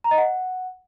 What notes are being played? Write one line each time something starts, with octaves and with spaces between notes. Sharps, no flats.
A#5
D#5
F#5